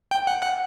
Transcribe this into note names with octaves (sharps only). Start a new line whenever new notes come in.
G5
F#5
F#5